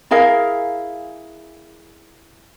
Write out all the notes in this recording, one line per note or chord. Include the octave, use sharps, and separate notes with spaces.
E4 G#4 A#4 F5